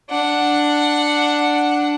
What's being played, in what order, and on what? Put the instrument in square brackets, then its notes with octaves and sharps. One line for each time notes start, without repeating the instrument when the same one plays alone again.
[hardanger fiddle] D4 F#5